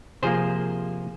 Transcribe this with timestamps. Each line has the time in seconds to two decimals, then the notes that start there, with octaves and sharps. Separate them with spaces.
0.23 C3 F3 A#3 G#4 C5